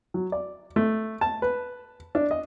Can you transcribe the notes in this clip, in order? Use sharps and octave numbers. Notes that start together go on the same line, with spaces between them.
F#3
D5
A3
A5
B4
D4
D#5